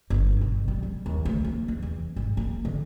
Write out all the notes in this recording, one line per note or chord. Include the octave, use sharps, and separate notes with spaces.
G1
B2
G3
G3
D#2
D2
A#3
D#2
E2
G#1
A#3
D3